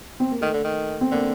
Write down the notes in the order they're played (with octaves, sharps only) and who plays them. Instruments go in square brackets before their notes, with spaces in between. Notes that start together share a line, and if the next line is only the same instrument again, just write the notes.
[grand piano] C4
A#3
[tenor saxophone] D#3 [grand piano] A3
[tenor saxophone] D3
D#3
[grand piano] C4
[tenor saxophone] D3 [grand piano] A#3